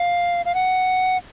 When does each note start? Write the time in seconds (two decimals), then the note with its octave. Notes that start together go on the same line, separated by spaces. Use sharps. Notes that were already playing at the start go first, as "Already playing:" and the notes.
Already playing: F5
0.46 F5
0.55 F#5